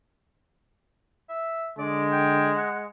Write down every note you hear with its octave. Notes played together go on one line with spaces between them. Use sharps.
E5
D3 G#3 D5
G5
F#5